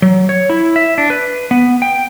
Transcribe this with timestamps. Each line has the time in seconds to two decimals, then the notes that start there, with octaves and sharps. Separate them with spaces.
0.02 F#3
0.29 C#5
0.50 E4
0.76 E5
0.98 D4
1.10 B4
1.51 B3
1.82 G5